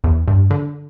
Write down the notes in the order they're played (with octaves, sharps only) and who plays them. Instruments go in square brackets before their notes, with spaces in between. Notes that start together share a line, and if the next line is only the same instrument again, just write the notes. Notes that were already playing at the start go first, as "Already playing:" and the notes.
[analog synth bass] E2
G2
D3